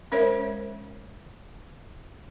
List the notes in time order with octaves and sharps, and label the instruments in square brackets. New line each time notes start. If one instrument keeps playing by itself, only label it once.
[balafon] G#3 C#4 A#4 C5 C#5 E5